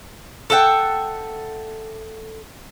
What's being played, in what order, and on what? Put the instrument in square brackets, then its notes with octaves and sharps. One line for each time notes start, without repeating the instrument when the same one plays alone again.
[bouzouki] A4 E5 F#5 G5